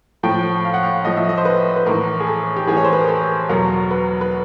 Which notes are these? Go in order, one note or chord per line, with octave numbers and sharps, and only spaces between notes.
A2 F3 G5
F5
F#5
F5
A2 F3 D#5
E5
D#5
C5
B4
B4
A2 E3 A#4
G#4
A4
G4
A2 E3 G#4
C#5
C5
B4
A#4
A4
E2 B2 F#3 A#4
B4
B4